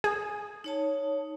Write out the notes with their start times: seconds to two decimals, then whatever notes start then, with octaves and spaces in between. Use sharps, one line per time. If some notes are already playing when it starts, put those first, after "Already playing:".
0.04 G#4
0.64 D#4 C#5 A5